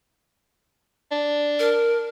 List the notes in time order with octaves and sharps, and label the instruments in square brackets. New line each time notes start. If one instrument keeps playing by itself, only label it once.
[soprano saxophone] D4
[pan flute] A#4